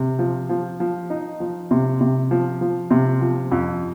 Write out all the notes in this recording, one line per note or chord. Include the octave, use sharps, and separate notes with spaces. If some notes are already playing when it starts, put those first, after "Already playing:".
Already playing: C3
F3
F3
F3
D#4
F3
C3
C3
F3
F3
C3
F3
F2